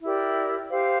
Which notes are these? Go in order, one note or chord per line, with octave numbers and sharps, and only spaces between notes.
E4 G4 A#4 D5
G4 C5 F5